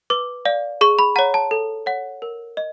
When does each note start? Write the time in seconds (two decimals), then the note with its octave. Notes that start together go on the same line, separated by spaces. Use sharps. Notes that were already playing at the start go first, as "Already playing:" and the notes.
0.10 B4 D6
0.45 D5 F5
0.81 G#4 C#6
0.99 B5
1.16 C#5 F#5 A#5
1.34 A5
1.51 A4
1.86 C#5 F#5
2.22 A#4
2.57 D#5